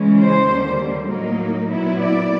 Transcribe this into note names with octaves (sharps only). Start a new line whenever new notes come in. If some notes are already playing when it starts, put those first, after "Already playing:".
Already playing: C#3 E3 G#3 C#4
C5
D#2 D3 G3
A2 F#3 A#3 D#4
A#2 F#3 B3 E4
D5